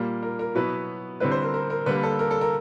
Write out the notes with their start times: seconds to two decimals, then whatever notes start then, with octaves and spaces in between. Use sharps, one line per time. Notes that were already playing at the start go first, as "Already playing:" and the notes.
Already playing: A#2 G3 A#3
0.23 A#4
0.39 A#4
0.55 B2 F#3 B3 E4 B4
1.20 D3 G3 C4 E4 B4
1.31 C5
1.43 A#4
1.54 A#4
1.70 A#4
1.86 D3 G3 A#3 B4
2.03 A4
2.19 A#4
2.31 A4
2.41 A#4